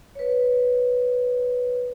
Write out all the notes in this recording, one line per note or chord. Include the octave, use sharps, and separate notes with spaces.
B4 C#5